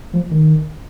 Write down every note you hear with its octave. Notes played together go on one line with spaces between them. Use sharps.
F3
D#3